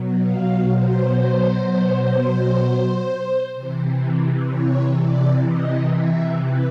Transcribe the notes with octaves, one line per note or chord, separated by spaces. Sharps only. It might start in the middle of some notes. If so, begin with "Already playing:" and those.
Already playing: B2 F#3
F5
C5
C3 E3
C#5
D5
D#5
E5
B4